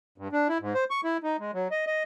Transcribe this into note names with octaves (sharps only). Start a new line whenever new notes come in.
G2
D4
E4
G#2
C5
C#6
E4
D#4
G#3
F#3
D#5
D#5